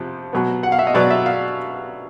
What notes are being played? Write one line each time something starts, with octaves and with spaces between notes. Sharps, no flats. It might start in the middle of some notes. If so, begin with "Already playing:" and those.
Already playing: F2 C3 F3
B2 F#3 B3
F#5
F5
E5
D#5
B2 F#3 B3 D5
E5
F5